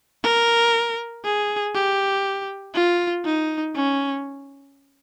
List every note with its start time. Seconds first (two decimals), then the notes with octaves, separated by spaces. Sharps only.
0.24 A#4
1.24 G#4
1.74 G4
2.74 F4
3.25 D#4
3.75 C#4